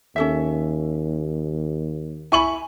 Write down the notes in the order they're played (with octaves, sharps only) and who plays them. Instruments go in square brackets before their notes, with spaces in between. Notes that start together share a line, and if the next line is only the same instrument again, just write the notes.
[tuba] D#2 [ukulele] C#4 A4 E5
[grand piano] E4 C#6 F#7 [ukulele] G#5 B5